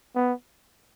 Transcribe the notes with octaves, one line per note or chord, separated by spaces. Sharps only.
B3